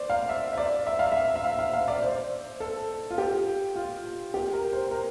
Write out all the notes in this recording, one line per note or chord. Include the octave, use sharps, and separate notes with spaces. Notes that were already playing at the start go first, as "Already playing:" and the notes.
Already playing: C5 D5
F5
E5
E5
D5
E5
F5
E5
E5
F5
F5
F5
D5
C5
A4
F4
G4
F4
G4
A#4
C5
A#4